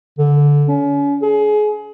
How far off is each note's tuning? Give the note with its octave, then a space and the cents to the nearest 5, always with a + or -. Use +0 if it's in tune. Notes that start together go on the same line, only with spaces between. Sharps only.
D3 -15
C#4 +35
G#4 +25